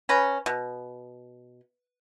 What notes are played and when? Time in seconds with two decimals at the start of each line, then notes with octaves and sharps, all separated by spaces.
0.09 C#4 B4 A#5
0.46 B2